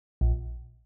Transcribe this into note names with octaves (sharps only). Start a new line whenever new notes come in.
A#1